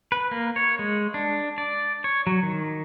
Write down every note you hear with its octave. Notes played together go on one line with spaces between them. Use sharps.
B4
A#3
C#5
G#3
D4
D5
C#5
F#3
D#3